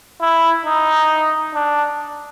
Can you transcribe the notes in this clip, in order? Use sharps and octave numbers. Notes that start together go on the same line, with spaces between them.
E4
D#4
D4